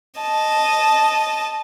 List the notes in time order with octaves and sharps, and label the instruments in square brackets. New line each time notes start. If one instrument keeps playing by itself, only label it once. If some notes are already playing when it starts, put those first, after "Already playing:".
[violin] D#5 A5